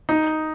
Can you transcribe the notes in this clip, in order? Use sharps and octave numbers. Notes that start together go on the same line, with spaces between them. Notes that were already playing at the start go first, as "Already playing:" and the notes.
D#4